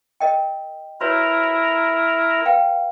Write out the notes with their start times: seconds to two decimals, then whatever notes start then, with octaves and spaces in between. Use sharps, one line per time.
0.20 A#4 D#5 G5
1.01 E4 F#4 A#4 B4 C#5 A#5
2.45 B4 F5 G5